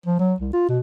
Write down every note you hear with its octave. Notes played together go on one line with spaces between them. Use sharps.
F3
F#3
C2
F4
B2